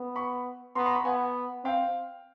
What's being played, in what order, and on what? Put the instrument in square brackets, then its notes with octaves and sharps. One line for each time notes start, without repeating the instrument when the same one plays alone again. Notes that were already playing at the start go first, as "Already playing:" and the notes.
Already playing: [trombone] B3
[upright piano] B5 C#6
[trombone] B3 [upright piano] A#5 C6
[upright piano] A#5 C6
B5 C#6
[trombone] B3 [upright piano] F#5 G#5
[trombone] C4 [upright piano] F5 G5